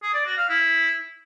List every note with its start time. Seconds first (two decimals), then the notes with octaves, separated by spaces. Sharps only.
0.02 G#4
0.14 D5
0.26 F#4
0.37 F5
0.49 E4